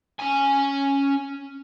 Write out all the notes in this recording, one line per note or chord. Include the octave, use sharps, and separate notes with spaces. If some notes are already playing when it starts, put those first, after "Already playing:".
C#4 G#5